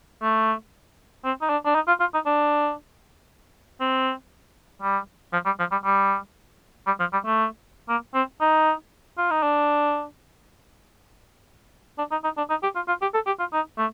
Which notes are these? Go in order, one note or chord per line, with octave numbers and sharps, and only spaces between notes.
A3
C4
D#4
D4
D4
D#4
F4
F4
D#4
D4
C4
G3
F3
G3
F3
G3
G3
G3
F3
G3
A3
A#3
C4
D#4
F4
D#4
D4
D4
D#4
D#4
D4
D#4
G4
F4
F4
G4
A4
G4
F4
D#4
A3